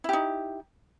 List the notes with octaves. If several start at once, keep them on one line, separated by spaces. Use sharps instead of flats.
D#4 E4 G4